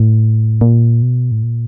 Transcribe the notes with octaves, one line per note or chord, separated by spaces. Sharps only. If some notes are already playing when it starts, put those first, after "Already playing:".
Already playing: A2
A#2
B2
A2
A#2